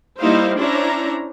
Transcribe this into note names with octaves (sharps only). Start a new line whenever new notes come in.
G3 A#3 D#4 E4 C5 F5
C#4 D4 E4 C5 C#5 A#5